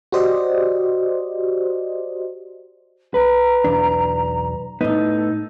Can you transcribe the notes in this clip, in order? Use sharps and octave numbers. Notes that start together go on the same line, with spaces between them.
F#4 G4 C5 D5 D#5
B4 A#5
B1 E2 D4
A2 B3 D#4 A4